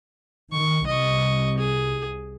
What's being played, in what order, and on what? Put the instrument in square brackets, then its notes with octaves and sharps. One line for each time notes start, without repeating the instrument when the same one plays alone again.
[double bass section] D#3 [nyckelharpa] C#6
[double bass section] C2 [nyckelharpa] D#5 C#6
[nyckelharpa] G#4